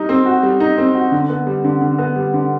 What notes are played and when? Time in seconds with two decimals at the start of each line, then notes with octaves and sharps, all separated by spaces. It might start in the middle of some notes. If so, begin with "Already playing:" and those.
Already playing: G3 D#4
0.09 C4
0.26 F#4
0.43 G3
0.60 D#4
0.78 C4
0.95 F#4
1.12 D3
1.29 B3
1.47 G3
1.64 D3
1.81 D3
1.99 B3
2.16 G3
2.34 D3